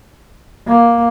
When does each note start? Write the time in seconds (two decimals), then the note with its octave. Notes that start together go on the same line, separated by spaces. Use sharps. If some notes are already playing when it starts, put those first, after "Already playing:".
0.67 A#3